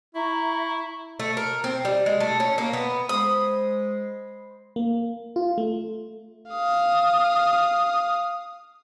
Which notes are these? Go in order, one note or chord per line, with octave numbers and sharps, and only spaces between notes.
E4 E5 A#5 C#6
A3
A#4
C4
G3
G#3
A3
C#4
A#3
B3
G#3 C5 B5 C6 D#6
A#3
F4
A3
F5 D#6